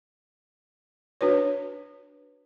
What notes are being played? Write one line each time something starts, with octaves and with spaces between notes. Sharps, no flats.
D4 F#4 B4 C#5